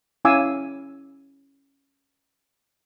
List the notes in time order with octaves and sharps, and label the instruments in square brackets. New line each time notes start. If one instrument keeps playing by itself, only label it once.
[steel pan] C#4 E4 F5 G#5 D6 E6